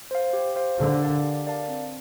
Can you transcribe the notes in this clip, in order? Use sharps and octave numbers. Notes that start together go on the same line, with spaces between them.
C5 F5
G4
C5 F5
D3 G4
A#4 D5 F5 A5
G4
A#4 D5 F5 A5
C4